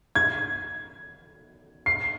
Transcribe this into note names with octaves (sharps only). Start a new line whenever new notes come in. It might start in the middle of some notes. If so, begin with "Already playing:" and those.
G#6
C7